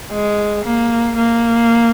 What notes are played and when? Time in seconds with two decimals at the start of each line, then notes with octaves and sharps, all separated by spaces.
0.11 G#3
0.65 A#3
1.17 A#3